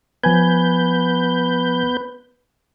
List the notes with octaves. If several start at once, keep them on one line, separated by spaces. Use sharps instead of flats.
F3 B3 B4 G#5 G6 G#6